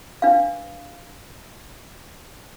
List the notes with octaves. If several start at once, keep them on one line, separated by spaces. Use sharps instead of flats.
D4 B4 F5